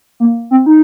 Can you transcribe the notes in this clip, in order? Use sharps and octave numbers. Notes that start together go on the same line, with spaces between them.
A#3
C4
D#4